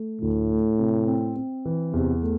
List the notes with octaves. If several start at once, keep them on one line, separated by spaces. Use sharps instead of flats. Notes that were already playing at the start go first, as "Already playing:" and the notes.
Already playing: A3
D2 A2
A3
C3
C4
C4
E3
E2 C3
A3